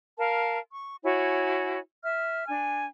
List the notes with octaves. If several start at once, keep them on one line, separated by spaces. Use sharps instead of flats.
A#4 F5 A5
C#6
E4 F#4 C#5 G#5
E5 F6
D4 G#5